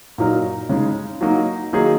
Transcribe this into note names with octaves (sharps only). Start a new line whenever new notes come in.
A#2 F#3 D#4 A#4
C#3 G#3 D#4
F#3 A#3 D#4 F#4
D#3 F#3 A#3 D#4 G#4